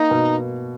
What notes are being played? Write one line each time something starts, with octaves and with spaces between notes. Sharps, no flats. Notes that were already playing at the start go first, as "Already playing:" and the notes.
Already playing: A#3 D#4
B2